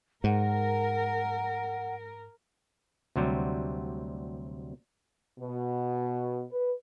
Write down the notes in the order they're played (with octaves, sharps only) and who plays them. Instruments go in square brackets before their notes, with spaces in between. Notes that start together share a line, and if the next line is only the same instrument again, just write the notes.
[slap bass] G#2 [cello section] A#4 [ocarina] F#5
[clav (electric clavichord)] D2 C3 F#3 G3
[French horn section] B2
B4